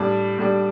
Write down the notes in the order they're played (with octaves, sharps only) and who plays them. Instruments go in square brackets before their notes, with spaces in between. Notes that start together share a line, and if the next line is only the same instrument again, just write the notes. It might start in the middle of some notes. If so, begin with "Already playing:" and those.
Already playing: [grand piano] A2 G3 D4 A5
A2 G3 D4